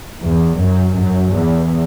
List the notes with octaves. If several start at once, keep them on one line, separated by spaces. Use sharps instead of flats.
E2
F#2
F#2
E2